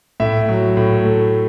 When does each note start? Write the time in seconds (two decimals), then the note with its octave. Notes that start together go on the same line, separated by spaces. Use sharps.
0.20 A2 E5
0.48 F#3
0.77 A2
1.05 A3